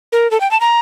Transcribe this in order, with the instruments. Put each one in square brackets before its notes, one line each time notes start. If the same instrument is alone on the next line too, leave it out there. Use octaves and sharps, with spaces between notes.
[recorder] A#4
A4
G5
A5
A#5